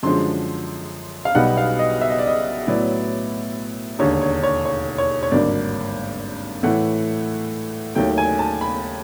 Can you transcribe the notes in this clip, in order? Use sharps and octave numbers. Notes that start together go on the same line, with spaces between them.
F#2 D3 F3 G#3 C6
F5
B1 B2 G3 B3 D#4 F#5
F5
D#5
E5
D#5
D5
D#5
A2 F#3 B3 E4 D5
E1 D#2 D3 C#5
C#5
C#5
C#5
C#5
C#5
G#1 G2 D3 F#3 A#3 D5
A2 E3 A3 F#5
D#2 D#3 F#3 A3 G5
G#5
A5
B5